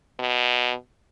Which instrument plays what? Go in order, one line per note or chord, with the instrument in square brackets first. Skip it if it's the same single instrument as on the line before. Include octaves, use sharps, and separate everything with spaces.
[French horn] B2